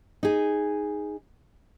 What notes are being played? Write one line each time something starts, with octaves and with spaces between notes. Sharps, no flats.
D#4 G#4